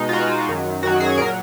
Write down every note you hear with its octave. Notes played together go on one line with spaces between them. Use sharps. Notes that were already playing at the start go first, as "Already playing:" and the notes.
Already playing: B2 G#3 D#4
F4
B2 G#3 F#4
F#2 D#3 F#3
F#2 D#3 F#3 F#4
G#4
A#2 F#3 A#4